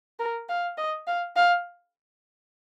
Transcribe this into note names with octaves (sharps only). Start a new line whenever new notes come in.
A#4
F5
D#5
F5
F5